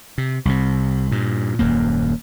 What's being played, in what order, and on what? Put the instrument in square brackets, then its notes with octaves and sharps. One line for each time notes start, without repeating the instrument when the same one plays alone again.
[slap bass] C3
C2 C3
G2 A#2
D#1 F#2 A#3